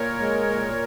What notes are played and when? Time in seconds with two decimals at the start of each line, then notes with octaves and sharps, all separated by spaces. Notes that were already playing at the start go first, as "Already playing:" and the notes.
Already playing: A#2 A#4 C#5
0.20 G#3
0.47 A#2